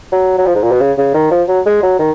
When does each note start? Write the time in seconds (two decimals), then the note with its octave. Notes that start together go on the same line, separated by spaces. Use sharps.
0.12 F#3
0.38 F#3
0.46 F3
0.55 G#2
0.63 A#2
0.71 B2
0.80 C#3
0.98 C#3
1.14 D#3
1.31 F3
1.48 F#3
1.66 G#3
1.83 F#3
1.99 D#3